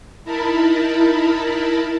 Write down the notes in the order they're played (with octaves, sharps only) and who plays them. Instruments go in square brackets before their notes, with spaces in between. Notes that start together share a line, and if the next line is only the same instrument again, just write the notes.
[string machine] D#4 E4 A#4 A5 B5